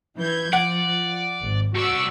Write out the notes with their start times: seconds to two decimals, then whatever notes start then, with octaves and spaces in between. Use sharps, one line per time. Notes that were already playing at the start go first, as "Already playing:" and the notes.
0.19 E3 G6 G#6
0.53 F3 D5 F#5
1.41 G#1
1.75 C2 F#4 D5 C#6 E6